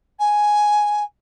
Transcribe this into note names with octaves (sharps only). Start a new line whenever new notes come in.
G#5